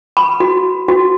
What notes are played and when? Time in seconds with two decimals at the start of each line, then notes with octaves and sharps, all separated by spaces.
0.17 B5
0.40 F#4
0.88 F#4